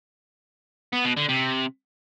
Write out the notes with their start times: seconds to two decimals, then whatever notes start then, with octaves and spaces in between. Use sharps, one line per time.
0.93 B3
1.05 B2
1.17 D3
1.29 C3